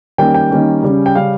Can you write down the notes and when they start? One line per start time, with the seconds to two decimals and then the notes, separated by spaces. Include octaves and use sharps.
0.18 D#3 G3 A#3 C#4 G5
0.34 G5
0.51 D#3 G3 A#3 C#4
0.83 C#3 G3 C#4
1.06 G5
1.15 C#3 G3 C#4 F5